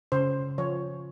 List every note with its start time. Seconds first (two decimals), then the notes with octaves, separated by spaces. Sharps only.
0.12 C#3 C5
0.58 F3 C#5